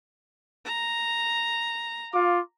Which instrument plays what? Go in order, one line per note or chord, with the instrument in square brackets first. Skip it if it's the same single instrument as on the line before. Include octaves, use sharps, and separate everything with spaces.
[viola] A#5
[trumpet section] F4 F5 D6